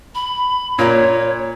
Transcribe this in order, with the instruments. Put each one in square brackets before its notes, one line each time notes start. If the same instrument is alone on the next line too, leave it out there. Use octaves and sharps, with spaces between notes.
[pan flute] B5
[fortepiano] A#2 [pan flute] C#5